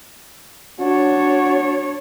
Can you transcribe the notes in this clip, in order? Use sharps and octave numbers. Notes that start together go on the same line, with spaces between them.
D4 F#4 C#5